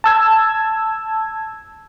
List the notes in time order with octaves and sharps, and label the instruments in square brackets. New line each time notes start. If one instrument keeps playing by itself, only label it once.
[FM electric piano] A5 E6 G#6